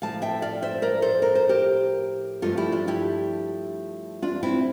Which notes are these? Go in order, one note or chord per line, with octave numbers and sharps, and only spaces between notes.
A2 F3 A3 F5 A5
E5 G5
D5 F5
C5 E5
A#4 D5
A4 C5
A#4
C5
G4 A#4
G2 F3 A3 F4 A4
E4 G4
D4 F4
E4 G4
D4 F4
C4 E4